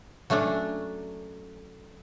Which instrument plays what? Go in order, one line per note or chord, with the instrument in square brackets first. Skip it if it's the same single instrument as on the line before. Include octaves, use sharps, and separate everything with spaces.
[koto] F#3 A3 C#4 D4